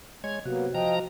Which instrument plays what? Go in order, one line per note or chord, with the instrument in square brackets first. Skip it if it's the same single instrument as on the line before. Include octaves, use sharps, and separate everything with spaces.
[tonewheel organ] G#3 C#5 G#6
[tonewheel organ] C3 [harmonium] F#3 A#3 B3 [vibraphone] F#4
[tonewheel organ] F3 A#5 [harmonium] D#5 G5